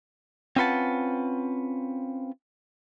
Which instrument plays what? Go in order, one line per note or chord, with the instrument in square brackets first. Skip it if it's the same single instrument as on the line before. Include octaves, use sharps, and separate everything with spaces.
[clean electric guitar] C4 C#4 F4 B4 F#5 A5